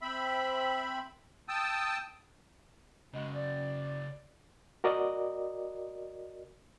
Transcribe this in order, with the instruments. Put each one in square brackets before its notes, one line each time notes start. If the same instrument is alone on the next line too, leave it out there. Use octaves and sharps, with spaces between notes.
[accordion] C4 E5 B5
G5 A5 D#6 E6
[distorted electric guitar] C#3 F#4 [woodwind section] G#3
[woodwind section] D5
[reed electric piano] F#4 A#4 D5 D#5